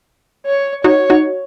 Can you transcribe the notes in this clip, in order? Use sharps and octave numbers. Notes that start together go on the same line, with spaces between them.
C#5
D#4 F#4 C#5
D#4 F#4